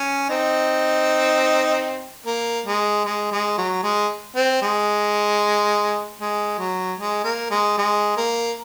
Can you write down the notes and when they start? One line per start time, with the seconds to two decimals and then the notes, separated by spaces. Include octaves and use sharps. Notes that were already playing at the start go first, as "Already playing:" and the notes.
Already playing: C#4
0.30 C4 D#4
2.26 A#3
2.66 G#3
3.05 G#3
3.32 G#3
3.58 F#3
3.83 G#3
4.36 C4
4.62 G#3
6.20 G#3
6.58 F#3
6.99 G#3
7.24 A#3
7.50 G#3
7.77 G#3
8.17 A#3